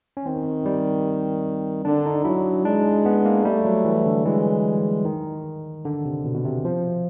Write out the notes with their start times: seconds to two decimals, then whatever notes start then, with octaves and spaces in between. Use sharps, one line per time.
0.17 C#4
0.25 D#3 C4
0.66 G3
1.85 D3 D4
2.06 D#4
2.25 F#3 E4
2.65 G#3 D4
3.05 B3
3.25 A#3
3.45 G3 A3
3.65 F#3
3.85 E3
4.06 D3
4.25 E3 G#3
5.05 D#3
5.85 D3
6.05 C3
6.25 B2
6.35 B2
6.45 C3
6.65 F3